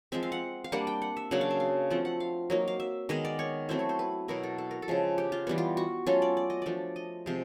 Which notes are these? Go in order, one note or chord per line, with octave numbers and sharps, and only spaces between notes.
F3 G#3 C4 E5
F5
F#5
F5
G3 A#3 D4 F#5
G5
F#5
E5
C#3 F#3 A#3 D4 F#5
F5
E5
F5
F3 A3 C4 F4 F#5
F#5
F5
F#3 A#3 D#4
F5
E5
D#3 G#3 B3 D#5
D5
C#5
F#3 A3 C4 E4 C5
C#5
C5
B4
B2 F#3 B3 E4 A#4
A4
A4
A#4
A4
C#3 F3 G#3
G4
F4
E3 G3 B3
F4
F#4
F#3 A3 C#4 F4 A4
D5
D5
D#5
F3 A3 D4 D5
D#5
C3 F3 G#3